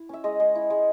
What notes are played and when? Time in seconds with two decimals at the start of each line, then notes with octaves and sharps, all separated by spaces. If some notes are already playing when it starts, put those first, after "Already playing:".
Already playing: E4
0.09 C#4 E5
0.24 G#3 D#5
0.40 G#3 D#5
0.55 E4
0.70 G#3